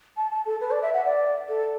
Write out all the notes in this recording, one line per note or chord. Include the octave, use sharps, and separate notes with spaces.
A5
A5
A4
B4
D5
E5
F#5
D5
A4